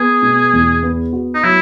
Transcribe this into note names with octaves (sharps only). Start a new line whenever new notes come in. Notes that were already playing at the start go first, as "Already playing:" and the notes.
Already playing: B3 G#4
B2
E2
B3
F#4
D#4
F#3 E4